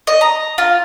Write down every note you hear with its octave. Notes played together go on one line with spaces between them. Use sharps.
D#5
A#5
F4